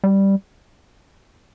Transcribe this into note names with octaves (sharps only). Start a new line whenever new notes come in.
G3